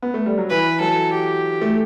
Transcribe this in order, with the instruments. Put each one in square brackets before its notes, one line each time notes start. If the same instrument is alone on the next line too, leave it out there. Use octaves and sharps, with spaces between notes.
[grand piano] B3
A3
G3
F#3
[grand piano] E3 [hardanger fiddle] B4
[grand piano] F#3 [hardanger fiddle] A4
[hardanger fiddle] G4
[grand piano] A3